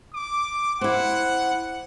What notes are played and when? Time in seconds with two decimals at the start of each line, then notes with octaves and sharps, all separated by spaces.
0.13 D6
0.81 C4 E4 F#5